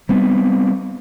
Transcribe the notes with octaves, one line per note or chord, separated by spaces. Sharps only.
G3 B3 C4